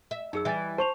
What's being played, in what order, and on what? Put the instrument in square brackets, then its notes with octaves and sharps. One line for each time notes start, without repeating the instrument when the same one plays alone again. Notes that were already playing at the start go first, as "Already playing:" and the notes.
[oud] E5
[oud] F#2 [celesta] D#4 G#4 E6
[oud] E3 G3 [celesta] E5 G#5 A6
[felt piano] C5 [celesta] A5 C#6 F7